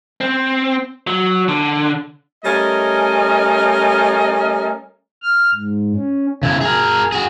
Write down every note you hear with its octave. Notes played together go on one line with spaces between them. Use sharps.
C4
F#3
D3
G3 A3 C#4 A#4 D#5
F6
G#2
C#4
C#3 E4
G#4 A#4
F#4 G#4